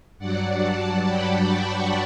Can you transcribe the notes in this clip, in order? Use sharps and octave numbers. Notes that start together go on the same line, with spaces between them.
G2 F#3 D5 F#5
F#5 A5
G5 B5
A5 C#6